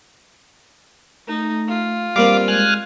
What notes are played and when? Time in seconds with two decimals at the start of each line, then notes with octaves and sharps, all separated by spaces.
1.28 A3 D#4
1.68 F4
2.16 G3 A#3 C4 F5 D6
2.48 G#3 G#5 F6 F#6